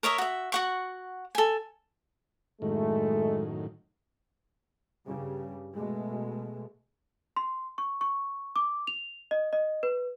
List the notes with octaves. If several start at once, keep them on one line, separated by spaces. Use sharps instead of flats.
A#4 C#5 D#5 E5
F#4 E5
F#4 F#5 C#6
A4 G#5
F#2 A2 D#3 G#3 A3
G2 C#3 G3
B2 G#3 A3
C6
C#6
C#6
D6
F7
D#5
D#5
B4